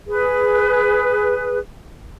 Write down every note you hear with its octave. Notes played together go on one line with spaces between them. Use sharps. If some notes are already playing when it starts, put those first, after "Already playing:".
G#4 B4